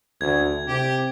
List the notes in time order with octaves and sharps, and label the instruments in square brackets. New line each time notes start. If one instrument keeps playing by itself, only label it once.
[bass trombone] D2 [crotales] G#6
[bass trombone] C3 [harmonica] G4